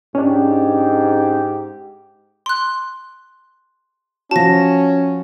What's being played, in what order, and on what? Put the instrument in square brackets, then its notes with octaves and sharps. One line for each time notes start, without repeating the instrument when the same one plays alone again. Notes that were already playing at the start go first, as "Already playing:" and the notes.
[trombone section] G#2 G4 [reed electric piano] C#4 D4
[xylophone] C6 F#6
[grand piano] F3 F#4 [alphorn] C#4 [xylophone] A5 A#6